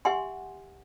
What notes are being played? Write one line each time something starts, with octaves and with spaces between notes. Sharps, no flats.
G4 E5 F#5 G#5 C6